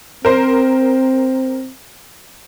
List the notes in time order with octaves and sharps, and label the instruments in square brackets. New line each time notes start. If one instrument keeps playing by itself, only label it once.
[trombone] C4 [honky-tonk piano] A#4 C5